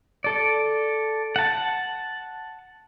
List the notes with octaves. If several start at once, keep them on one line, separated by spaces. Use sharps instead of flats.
A4 D5
F#5 A5